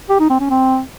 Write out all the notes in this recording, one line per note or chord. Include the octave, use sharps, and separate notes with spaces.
G4
D#4
C4
C#4
C4